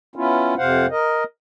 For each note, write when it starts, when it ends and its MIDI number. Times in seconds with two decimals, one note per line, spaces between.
0.16 0.54 59
0.16 0.54 61
0.16 0.54 64
0.16 0.54 65
0.58 0.86 41
0.58 0.86 48
0.58 0.86 72
0.58 0.86 77
0.58 0.86 78
0.91 1.24 70
0.91 1.24 75